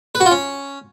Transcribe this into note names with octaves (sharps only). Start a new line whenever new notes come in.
B4
F#4
F4
C#4